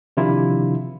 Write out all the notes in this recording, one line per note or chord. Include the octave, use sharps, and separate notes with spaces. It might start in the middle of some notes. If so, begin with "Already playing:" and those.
C3 D#3 F3 D4 E4 F4